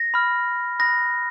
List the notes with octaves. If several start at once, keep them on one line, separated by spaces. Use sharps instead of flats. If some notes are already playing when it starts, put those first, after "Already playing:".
Already playing: A#6
B5 F6
B5 D#6 F#6 A#6